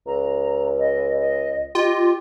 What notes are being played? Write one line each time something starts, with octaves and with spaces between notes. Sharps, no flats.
C#2 A#5
D#5
D#5
F4 G4 D#5